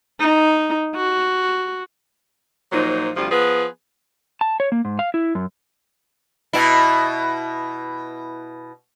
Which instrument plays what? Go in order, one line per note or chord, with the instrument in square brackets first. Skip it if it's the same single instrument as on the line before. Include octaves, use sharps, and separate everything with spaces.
[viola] D#4
F#4
[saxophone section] A#2 F3 F#3 D#4 C5
D2 C3 F3 G3 F4
F3 B3 G#4 B4
[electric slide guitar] A5
C#5
A#3
G#2
F5
E4
F#2
[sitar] B2 E4